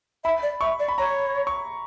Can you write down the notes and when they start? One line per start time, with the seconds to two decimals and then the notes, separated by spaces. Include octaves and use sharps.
0.24 E5 B5
0.43 D5
0.61 E5 C#6
0.80 D5
0.88 B5
0.98 C#5 A#5
1.47 C#6